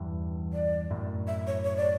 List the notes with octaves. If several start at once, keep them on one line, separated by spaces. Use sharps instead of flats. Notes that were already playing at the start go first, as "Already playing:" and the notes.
Already playing: E2 G2
D5
F#2 A2
E5
C#5
C#5
D5